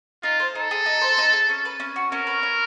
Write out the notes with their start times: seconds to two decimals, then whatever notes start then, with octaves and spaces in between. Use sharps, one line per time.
0.23 D#4 F4
0.40 C5
0.55 D#4 A4
0.71 G#4
0.86 D#4
1.01 C5
1.18 D#4
1.33 G#4
1.49 C#4
1.65 B4
1.80 C#4
1.96 F#4
2.12 C#4 A#4
2.27 B4
2.43 C#4